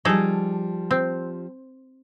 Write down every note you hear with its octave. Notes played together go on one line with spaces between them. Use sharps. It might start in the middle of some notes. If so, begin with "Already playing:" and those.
F3 G3 D#4 G#4 A4
C4